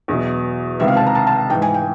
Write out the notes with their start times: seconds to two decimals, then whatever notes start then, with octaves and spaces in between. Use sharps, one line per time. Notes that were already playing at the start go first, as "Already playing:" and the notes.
0.08 E2 B2 F#3
0.80 C#2 C3 D#3 E5
0.88 F5
0.97 A5
1.06 A#5
1.15 A5
1.27 A5
1.50 G#2 E3 G5
1.62 G#5
1.74 G5